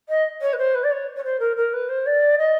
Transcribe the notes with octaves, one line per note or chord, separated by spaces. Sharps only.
D#5
C#5
B4
C5
B4
D5
C#5
C#5
C5
A#4
A#4
B4
C5
D5
D#5